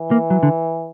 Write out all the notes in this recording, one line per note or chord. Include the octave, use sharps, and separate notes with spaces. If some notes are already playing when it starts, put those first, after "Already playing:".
Already playing: E3
A#3
F#3
D3